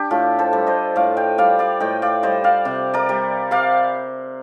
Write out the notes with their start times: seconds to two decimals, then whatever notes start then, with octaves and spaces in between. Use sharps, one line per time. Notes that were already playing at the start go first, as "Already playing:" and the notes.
Already playing: D4 G4
0.11 A2 F4 A4
0.39 A4 C5
0.53 G3
0.67 C5 D#5
0.96 A2 D5 F5
1.17 D#5 G5
1.38 G3 D5 F5
1.59 D5 F5
1.80 A2 D#5 G5
2.02 D5 F5
2.23 G3 C5 D#5
2.44 D5 F5
2.65 C3
2.94 A#4 D5
3.09 G3
3.51 C3 D5 F5